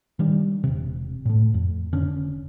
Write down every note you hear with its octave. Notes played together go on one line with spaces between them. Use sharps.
D#3 G3 D4
E1 C3
A2 A3
F2
F1 D3 C#4 D4